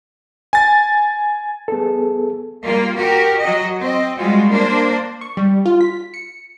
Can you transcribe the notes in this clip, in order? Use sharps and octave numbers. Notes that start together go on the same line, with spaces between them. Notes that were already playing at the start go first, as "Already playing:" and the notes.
G#5 A6
B3 G#4 A4
G3 A#3 F4
F#4 G4 A#4
F#3 F#4 D#5
C4 D#5
G3 G#3 F4 F#4
A#3 D4 C5
C#6
G3
F4
B6
C#7